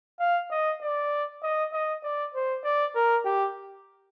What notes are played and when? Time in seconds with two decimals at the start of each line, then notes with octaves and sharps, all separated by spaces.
0.20 F5
0.51 D#5
0.81 D5
1.43 D#5
1.73 D#5
2.03 D5
2.34 C5
2.64 D5
2.95 A#4
3.25 G4